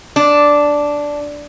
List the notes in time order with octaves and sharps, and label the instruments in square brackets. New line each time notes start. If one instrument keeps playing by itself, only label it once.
[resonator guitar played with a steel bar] D4